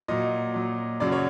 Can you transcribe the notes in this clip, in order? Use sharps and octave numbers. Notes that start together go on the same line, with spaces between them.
A#2 F#3 D#5
A#2 F#3
F#2 C#3 F#3 D5
C#5